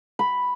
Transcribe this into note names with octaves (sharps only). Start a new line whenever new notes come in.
B5